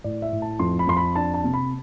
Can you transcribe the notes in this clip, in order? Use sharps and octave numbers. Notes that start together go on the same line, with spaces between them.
A2 D5
E5
A2
A5
F2 C6
B5
F2 C6
B5
D4 A5
A5
C3
B5